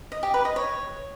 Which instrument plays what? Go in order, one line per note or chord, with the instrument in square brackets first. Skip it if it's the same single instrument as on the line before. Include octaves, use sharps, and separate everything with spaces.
[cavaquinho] D#5
G4
B4
D#5
C#5